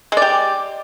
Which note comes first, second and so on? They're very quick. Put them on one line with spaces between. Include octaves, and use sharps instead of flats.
G#3 D5 G4